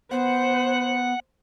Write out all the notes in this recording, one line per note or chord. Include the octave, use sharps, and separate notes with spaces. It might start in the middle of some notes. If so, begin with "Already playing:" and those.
B3 C5 F#5